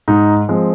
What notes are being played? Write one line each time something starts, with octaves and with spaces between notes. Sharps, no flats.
G#2 D#4
F3 G#3 C4